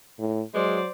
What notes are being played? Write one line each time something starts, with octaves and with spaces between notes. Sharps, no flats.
A2
F#3 G#3 C5 D5